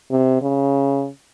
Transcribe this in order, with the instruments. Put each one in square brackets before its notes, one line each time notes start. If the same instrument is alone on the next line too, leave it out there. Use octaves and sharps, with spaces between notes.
[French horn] C3
C#3